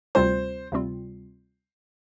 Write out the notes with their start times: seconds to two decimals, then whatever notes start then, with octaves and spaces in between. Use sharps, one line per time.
0.15 D2 C3 G3 C4 F4 C5
0.72 D2 C3 G3 C4 F4